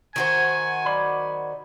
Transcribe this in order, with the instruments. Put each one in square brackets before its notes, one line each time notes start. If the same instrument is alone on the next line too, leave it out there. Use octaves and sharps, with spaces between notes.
[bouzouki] D#3 F#4 C5 [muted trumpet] G#5
[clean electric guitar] D5 B5